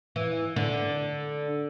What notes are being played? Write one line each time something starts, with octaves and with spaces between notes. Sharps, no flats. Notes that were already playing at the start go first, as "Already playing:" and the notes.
E3
D3